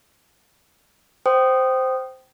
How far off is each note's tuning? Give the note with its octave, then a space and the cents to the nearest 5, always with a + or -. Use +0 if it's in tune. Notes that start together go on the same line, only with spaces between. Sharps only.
C5 -5 G5 -20 D#6 -10